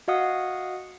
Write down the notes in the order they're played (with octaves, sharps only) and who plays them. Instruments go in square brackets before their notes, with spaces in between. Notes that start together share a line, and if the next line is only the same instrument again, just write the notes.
[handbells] F#4 D#5 F5 F#5 D#6